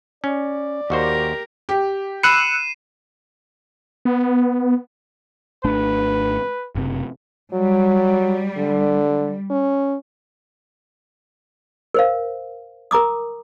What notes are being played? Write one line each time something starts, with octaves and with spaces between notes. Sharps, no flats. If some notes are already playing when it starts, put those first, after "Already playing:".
C#4 D5
D#2 F#4 G4 A#4 C5
G4
B5 E6 F#6 C7 C#7 D#7 E7
B3
G#1 A3 D4 B4
F#1 C3
F#3 G3
D3
C#4
A#4 C5 F5
A#4 A#5 D6 D#6